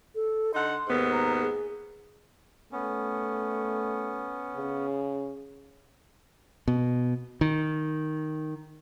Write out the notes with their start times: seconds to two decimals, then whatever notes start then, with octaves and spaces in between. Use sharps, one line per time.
0.15 A4
0.54 D3 D#4 F#5 C6
0.87 D#2 G#2 B3
1.12 A#5
1.41 G#4
2.72 A3 B3 C#4
4.56 C#3
6.68 B2
7.41 D#3